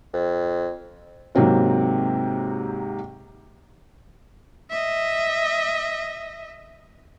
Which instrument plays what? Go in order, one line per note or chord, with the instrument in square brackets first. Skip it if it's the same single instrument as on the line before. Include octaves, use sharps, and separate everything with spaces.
[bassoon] F2
[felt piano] G#2 C3 F#3 A#3 C4 F#4
[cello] D#5 E5